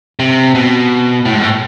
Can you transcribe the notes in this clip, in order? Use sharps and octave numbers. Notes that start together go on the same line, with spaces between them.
C3
B2
A2
G#2
A2